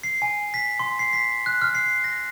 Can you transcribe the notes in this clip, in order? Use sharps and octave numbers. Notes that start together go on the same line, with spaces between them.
C7
G#5
B6
C6
C7
B6
F#6
F6
C7
A#6